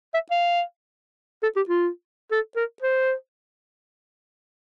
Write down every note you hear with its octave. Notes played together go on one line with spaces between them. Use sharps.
E5
F5
A4
G4
F4
A4
A#4
C5